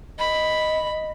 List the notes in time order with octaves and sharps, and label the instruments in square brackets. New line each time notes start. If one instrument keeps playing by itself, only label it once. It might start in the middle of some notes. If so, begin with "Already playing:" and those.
[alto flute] D#5 [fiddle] B5